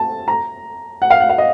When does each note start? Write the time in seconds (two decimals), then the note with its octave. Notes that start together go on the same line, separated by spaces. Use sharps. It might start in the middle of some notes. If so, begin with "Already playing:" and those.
Already playing: A5
0.28 A#5
1.02 F#5
1.10 F5
1.20 F#5
1.29 F5
1.38 D#5